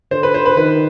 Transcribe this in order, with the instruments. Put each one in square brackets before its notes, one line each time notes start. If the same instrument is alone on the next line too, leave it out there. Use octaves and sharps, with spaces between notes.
[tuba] D3 [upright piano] C5
[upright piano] B4
C5
B4
[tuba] D#3 [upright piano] B4